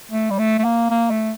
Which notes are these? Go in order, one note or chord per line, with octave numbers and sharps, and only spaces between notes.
A3
G3
A3
A3
A#3
A#3
A3